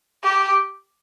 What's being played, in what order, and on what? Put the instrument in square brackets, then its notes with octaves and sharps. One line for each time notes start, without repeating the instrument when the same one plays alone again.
[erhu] G4